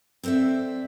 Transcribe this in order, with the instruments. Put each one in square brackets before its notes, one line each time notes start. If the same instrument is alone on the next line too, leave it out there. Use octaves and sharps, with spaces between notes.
[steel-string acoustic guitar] C4 A4 C5 D5 E5